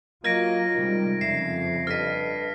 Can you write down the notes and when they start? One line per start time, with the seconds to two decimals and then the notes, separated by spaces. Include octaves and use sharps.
0.24 F#3 A#3 F4 D#5 G#6 A#6 D7
0.75 C3 D#3 G3 G#3
1.21 F2 C#3 E5 C7
1.87 G2 A4 D#5 F6 B6